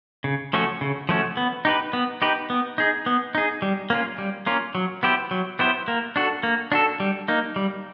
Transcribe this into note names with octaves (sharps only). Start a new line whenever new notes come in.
C#3
F3 A3 C#4 F#4
C#3
F3 A3 C#4 F#4
B3
D#4 G4 B4
B3
D#4 G4 B4
B3
D#4 G#4
B3
D#4 G#4
G3
A#3 C#4 F4
G3
A#3 C#4 F4
F#3
B3 E4 G4 C5
F#3
B3 E4 G4 C5
A#3
D4 F#4 A4
A#3
D4 F#4 A4
G3
A#3 D#4
G3